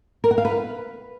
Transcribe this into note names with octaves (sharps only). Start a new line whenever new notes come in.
A#4
F#5
F5
B4